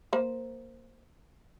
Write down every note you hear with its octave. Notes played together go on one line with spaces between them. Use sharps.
A#3 C5